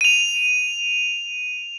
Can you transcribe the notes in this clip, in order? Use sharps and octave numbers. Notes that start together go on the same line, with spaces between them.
D#7 F7